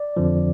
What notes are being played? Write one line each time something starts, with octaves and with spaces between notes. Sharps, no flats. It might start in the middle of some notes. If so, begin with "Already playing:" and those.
Already playing: D5
F2 D3 F3